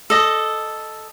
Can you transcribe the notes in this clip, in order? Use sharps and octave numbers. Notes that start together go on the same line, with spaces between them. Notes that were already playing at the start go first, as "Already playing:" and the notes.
A4 D#5